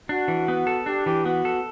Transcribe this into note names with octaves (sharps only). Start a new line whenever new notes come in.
D4 F#4
E3
B3
A4
D4 G4
E3 G4
B3 F#4
A4